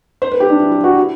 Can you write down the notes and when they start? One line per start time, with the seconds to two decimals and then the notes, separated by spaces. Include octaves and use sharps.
0.22 C5
0.32 B4
0.40 G4
0.50 D4
0.60 E4
0.72 E4
0.84 F#4
0.97 E4